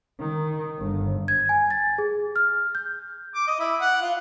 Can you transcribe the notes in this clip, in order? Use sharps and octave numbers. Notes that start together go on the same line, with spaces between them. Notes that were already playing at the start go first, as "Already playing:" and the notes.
D#3
G1
G#6
G#5
A6
G#4
F6
G6
D6
D#5
E4
F#5
F4